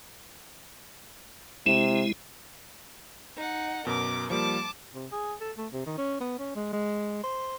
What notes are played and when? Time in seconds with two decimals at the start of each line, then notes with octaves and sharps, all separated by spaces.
1.66 C3 G#3 E4 E7
3.36 D#4 F#5
3.87 F#2 B2 A#4 D6
4.30 F3 G3 A#3 A5 D6
4.95 C3
5.12 G#4
5.40 A4
5.58 A3
5.73 C3
5.86 D#3
5.98 C#4
6.20 B3
6.39 C#4
6.55 G#3
6.73 G#3
7.24 C5